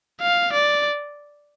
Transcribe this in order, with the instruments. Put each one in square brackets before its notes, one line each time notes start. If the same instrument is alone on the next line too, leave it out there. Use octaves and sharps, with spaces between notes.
[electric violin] F5
D5